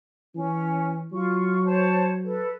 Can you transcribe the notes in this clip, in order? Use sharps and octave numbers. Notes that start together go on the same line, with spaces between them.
E3 C#4
F#3 F4 C#6
C5 C#5 A5
A4 B4